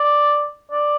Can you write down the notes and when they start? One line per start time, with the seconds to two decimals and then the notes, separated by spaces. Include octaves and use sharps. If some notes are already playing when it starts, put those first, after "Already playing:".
Already playing: D5
0.71 D5